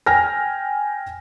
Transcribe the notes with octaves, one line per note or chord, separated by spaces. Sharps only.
G5 G#5 F6 A#6